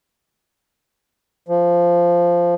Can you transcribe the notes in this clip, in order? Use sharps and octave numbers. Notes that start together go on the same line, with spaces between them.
F3